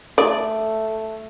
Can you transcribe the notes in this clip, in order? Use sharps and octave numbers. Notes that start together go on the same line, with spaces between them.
A3 D5